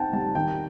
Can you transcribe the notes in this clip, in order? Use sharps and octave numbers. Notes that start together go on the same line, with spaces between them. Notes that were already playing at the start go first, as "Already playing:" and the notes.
Already playing: C4 D#4 F#5 G5 A5
G3 A5
D#3 G5